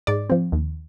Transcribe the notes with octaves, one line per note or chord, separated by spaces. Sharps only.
G#2 D5
F3 C4
D#2